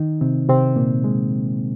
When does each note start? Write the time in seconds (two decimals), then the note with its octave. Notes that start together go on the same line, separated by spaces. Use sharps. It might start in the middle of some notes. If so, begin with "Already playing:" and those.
Already playing: D#3 D#4
0.21 C3 C4
0.49 C3 C4
0.76 A#2 A#3
1.04 G#3